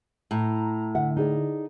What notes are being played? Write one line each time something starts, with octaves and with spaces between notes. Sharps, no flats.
A2 A#5
D3 E5 F#5
D#4 G#4 D5